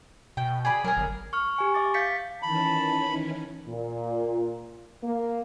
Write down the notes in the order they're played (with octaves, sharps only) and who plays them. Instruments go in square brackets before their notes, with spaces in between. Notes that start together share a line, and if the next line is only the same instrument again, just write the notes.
[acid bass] B2 [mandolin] G5
[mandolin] G#4 D5 B5
[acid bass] F#3 [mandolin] G#4 A#4
[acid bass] G1
[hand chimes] C#6 F6
G4 G#5 C#6
E5 D6 A6
F5 G6 A6 B6 C#7
[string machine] D#3 E3 C#4 [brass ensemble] A5 [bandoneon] B5
[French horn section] A#2
A#3